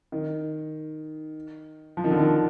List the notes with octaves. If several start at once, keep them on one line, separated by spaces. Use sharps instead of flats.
D#3
F3
D#3
D3
D#3